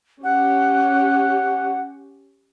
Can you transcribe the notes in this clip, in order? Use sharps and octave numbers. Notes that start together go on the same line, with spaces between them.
C#4 G4 F#5